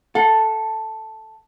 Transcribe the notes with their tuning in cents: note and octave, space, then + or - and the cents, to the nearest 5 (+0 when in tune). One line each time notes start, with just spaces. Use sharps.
A4 +0 F#5 -40